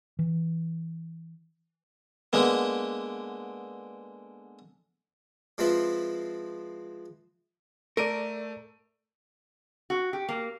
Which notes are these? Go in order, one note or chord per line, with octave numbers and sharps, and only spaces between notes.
E3
D3 G#3 A#3 B3
F3 G#3 C4 E4 F4 B4
A3 A4 A#4 D5 D7 D#7
F#4
G4
A#3